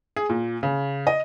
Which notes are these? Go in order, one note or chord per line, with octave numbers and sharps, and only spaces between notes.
G#4
A#2
C#3
D#5